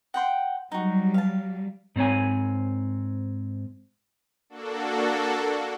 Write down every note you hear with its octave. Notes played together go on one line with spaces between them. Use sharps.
F#5 G5 C6
F#3 G3 D#4 F#4
F5 A5
G#2 C4 C#5 G#5
A#3 D4 F#4 A4